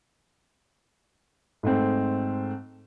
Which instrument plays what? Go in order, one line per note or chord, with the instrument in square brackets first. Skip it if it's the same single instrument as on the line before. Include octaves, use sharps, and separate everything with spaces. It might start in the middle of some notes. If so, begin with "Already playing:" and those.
[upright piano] G#2 A3 C4